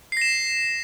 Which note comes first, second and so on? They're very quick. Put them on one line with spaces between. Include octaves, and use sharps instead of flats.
C7 A#6 E7